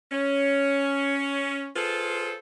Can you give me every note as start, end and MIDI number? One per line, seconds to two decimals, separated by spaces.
0.12 1.68 61
1.76 2.35 65
1.76 2.35 68
1.76 2.35 69
1.76 2.35 71
1.76 2.35 72